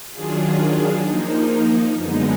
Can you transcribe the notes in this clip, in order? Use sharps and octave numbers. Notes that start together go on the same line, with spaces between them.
D#3 F#3 D4 F4 G#4
F3 A#3 D#4
F#2 D3 G#3 B3 D#4